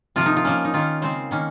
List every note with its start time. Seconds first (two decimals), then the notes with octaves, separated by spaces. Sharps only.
0.16 C3 F3 A#3 F4
0.26 D#4
0.37 F4
0.45 F3 A#3 C#4
0.65 D#4
0.74 D#3 A#3 C#4 F4
1.02 C#3 G#3 C4 C5
1.31 D#3 A#3 C#4